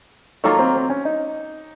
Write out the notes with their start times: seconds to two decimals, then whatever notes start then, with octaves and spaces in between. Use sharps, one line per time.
0.44 D#3 F#3 A#3 F4 A4
0.59 C4
0.75 C4
0.90 C#4
1.05 D#4